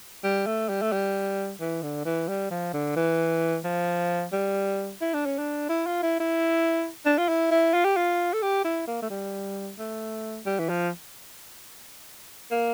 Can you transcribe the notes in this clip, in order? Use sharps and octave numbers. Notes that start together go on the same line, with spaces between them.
G3
A3
G3
A3
G3
E3
D3
E3
G3
F3
D3
E3
F3
G3
E4
D4
C#4
D4
E4
F4
E4
E4
D4
F4
E4
E4
F4
G4
F4
A4
G4
E4
A#3
A3
G3
A3
G3
E3
F3
A#3